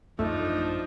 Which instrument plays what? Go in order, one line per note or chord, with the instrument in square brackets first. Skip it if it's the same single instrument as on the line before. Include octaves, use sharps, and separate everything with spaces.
[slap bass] A1 F#2 B3 [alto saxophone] F3 [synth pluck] A3 [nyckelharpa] D4 D#4